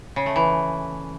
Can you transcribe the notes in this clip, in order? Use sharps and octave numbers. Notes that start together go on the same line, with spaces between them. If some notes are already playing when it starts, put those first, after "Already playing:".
C#3
A3
E3